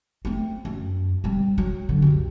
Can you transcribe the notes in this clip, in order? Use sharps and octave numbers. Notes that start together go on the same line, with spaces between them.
A3 C4
F#2
G3 C4
F#3
D3
C2 F#2